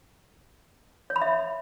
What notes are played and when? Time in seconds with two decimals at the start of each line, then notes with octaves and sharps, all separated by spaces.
1.10 C#5
1.16 B5
1.22 E5